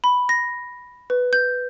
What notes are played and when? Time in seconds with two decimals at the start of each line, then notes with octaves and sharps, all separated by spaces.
0.04 B5
0.29 A#6
1.10 B4
1.33 G6